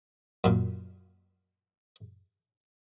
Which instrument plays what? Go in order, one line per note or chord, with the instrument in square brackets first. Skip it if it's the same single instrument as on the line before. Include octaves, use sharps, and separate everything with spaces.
[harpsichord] F#2 A#2